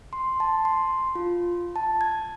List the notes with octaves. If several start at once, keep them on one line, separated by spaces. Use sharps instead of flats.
C6
A5
C6
F4
A5
G#6